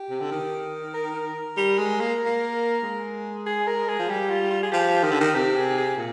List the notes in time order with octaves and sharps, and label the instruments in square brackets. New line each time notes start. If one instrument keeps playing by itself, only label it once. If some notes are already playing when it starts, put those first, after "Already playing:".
Already playing: [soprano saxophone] G4
[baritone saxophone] C3
D3
D#3
[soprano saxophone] A#4
[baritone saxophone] G3
G#3
A#3
A#3
G#3
[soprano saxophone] G#4
A#4
G#4
[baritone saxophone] F3
[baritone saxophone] G3 [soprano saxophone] G4
[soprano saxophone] F4
F4
G#4
[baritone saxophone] F3 [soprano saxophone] G4
[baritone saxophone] D#3
D3
D#3
[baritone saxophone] C3 [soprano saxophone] G4
[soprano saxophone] G#4
G#4
[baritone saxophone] A#2